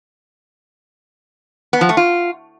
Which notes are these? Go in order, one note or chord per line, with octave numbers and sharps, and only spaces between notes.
B3
F3
A3
F4